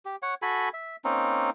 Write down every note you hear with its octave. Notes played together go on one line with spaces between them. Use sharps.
G4
C#5 F#5
F#4 A4 G#5 B5
E5
A#3 C4 C#4 D#4